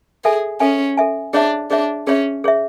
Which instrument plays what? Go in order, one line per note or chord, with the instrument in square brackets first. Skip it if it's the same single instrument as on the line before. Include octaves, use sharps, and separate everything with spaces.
[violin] G#4 [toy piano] A4 E5 G#5
[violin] C#4 [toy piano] A4 E5 G#5
[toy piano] A4 E5 G#5
[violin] D4 [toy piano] G#4 C#5 E5
[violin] D4 [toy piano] G#4 C#5 E5
[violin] C#4 [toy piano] G#4 C#5 E5
[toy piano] G#4 C#5 E5